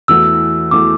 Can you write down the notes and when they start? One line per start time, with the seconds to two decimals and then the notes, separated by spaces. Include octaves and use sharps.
0.08 E2 E3 A3 F#4 E6
0.71 E2 E3 A3 F#4 D6